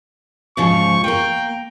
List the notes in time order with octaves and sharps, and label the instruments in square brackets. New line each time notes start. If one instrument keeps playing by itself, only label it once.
[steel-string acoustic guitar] G#2 C#3 F3 [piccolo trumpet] C#6
[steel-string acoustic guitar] A#3 A#4 [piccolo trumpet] G5